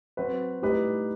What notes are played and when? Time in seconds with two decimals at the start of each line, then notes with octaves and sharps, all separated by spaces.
0.17 F#3 C4 F#4 B4
0.62 A2 G3 D#4 G4 B4